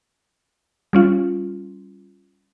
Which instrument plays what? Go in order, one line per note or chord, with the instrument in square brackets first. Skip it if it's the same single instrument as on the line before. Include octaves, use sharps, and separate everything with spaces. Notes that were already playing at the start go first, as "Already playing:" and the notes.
[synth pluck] G3 C#4 F4